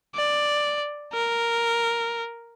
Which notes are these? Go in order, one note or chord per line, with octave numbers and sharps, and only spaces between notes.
D5
A#4